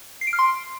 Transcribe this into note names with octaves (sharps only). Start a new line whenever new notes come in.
C7
D7
F6
C6